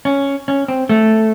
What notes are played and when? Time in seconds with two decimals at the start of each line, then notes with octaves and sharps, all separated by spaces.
0.05 C#4
0.48 C#4
0.68 C4
0.89 A3